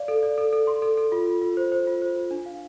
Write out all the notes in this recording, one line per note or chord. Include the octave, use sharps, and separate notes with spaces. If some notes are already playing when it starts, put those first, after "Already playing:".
Already playing: D5 F5
A4
D5
A4
A4
C6
A4
A4
F4
F4
F4
C5
C5
F4
C5
F4
D4
F5